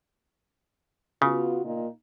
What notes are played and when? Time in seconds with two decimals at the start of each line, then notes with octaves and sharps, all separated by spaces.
1.22 C#3 B3 F4 F#4
1.63 A#2 A#3 D#4